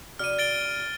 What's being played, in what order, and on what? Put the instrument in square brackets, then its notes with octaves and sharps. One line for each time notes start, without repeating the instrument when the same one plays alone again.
[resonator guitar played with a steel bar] C#3 F#4 D5 [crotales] F6 D#7
[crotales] A6 D7 G7